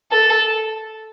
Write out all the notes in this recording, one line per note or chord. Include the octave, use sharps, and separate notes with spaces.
A4